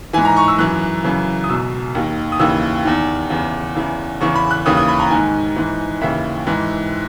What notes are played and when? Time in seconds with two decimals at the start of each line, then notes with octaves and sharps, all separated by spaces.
0.13 G#2 E3 G#5
0.25 A#5
0.37 C#6
0.48 E6
0.58 F#2 E3 F#6
1.04 F#2 C#3 E3
1.44 D#6
1.49 C#2 B2 E6
1.95 D#2 D#3
2.32 D#6
2.39 D#2 C#3 E3 E6
2.85 E2 D#3
3.30 E2 C#3 E3
3.75 E2 C#3 E3
4.20 E2 C#3 E3 C#6
4.36 B5
4.51 F#6
4.66 D#2 C#3 E3 D#6
4.77 D#6
4.88 B5
4.99 A#5
5.10 G#2 D#3 G#5
5.56 G#2 E3
6.01 D#2 C#3 E3 E5
6.47 G#2 E3